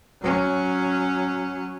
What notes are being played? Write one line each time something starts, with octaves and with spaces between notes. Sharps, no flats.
F#3 C#4